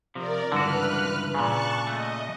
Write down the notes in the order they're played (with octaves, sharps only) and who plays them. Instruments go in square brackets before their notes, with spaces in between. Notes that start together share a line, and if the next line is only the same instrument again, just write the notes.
[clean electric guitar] C3 F3 [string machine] A#4 D5
[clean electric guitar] C#2 G2 E3 [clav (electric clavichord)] D3 F#4 [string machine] B4 F6 F#6
[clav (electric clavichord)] A#2 C#3 [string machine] A5 C#6 F#6
[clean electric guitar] A3 [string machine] D#5